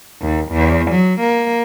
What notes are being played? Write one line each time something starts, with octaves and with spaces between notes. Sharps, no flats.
D#2
E2
F#3
A#3